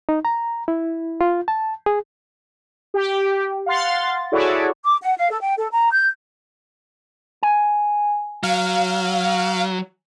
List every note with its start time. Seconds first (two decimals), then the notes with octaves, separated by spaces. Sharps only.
0.09 D#4
0.25 A#5
0.68 E4
1.21 F4
1.48 A5
1.86 G#4
2.94 G4
3.66 F5 F#5 C6 A6
4.32 E4 F#4 G#4 A4 C#5 D5
4.83 D6
5.01 F#5
5.18 F5
5.29 A4
5.41 G5
5.57 A4
5.72 A#5
5.92 G6
7.43 G#5
8.43 F#3 F5